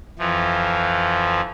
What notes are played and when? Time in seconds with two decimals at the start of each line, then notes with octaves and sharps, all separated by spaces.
0.19 F2 E3 F3